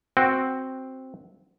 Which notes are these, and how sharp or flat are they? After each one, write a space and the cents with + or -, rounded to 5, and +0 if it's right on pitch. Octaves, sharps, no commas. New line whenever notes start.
C4 +0 F#4 +0 G5 +0